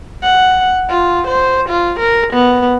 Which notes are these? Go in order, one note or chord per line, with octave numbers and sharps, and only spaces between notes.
F#5
F4
C5
F4
A#4
B3